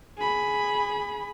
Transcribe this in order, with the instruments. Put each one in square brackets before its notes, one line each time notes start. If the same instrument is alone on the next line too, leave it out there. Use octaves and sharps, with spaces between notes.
[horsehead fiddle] G#4 B5